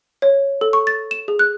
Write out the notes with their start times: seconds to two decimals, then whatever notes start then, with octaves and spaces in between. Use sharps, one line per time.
0.22 C#5
0.61 A4
0.73 C#6
0.87 A6
1.11 E7
1.28 G#4
1.39 F#6